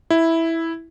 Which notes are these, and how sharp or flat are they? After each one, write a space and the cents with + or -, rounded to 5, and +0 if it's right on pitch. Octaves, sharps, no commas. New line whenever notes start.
E4 -5